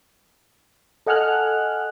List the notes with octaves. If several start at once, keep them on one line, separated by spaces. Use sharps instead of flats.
A4 D#5 F#5 G#5 F6 F#6